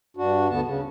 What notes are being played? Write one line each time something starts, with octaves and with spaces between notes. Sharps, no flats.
G2 D4 F#4
D2 D3 B3 A5
C#3